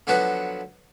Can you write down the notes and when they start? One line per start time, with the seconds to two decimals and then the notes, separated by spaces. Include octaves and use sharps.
0.07 D3 F3 F#3 B3 F#4 B4